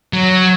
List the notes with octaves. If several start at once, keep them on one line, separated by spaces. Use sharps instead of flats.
F#3